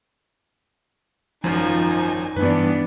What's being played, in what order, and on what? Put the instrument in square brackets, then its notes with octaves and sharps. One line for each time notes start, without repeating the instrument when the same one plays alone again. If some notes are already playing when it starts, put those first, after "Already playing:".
[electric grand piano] G#1 F#2 [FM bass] F3 [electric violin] D#4 G#5
[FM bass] G2 [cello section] E3 B3 D4 [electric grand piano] B4